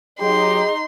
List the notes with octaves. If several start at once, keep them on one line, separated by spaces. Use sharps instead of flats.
F#3 D#4 G4 G#4 C6